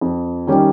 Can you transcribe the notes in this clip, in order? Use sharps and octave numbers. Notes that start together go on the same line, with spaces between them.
F2
D#3 G3 C#4 G4